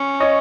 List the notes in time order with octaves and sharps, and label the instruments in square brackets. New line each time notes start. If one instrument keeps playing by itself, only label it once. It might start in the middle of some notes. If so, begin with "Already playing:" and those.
Already playing: [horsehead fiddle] C#4
[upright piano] C#5 D#5